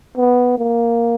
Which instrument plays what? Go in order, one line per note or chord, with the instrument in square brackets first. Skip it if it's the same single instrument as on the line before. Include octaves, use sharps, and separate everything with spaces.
[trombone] B3
A#3